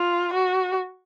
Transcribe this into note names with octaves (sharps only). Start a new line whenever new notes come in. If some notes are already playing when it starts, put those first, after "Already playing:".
Already playing: F4
F#4